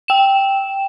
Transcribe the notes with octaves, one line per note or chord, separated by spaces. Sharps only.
G5 E7